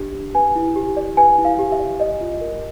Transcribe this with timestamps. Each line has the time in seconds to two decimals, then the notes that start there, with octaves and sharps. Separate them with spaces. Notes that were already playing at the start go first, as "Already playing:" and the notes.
Already playing: D4 G4
0.15 D4
0.35 B4 G#5
0.55 E4
0.76 G4
0.97 D5
1.17 B4 G#5
1.38 E4
1.45 F5
1.59 G4
1.72 E5
1.79 D5
2.00 D5 D#5
2.21 F4
2.41 A#4